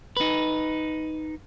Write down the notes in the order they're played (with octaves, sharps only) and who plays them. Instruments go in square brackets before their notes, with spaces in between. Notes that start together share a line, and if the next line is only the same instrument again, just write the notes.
[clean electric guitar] D#4 B4